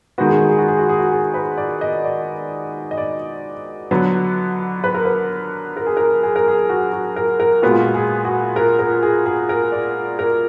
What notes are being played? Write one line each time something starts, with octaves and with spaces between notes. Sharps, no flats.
D#3 G#3 B3 F#4
G#4
F#4
G#4
F#4
G#4
F#4
G#4
F#4
G#4
B4
D5
D#5
D5
D#5
D5
D3 F#3 B3
B4
A#4
B4
A#4
G#4
A#4
G#4
A#4
G#4
F#4
F#4
A#4
A#4
A#2 G#3 B3 F#4
F4
F#4
G#4
F#4
A#4
A#4
G#4
G#4
A#4
D5
A#4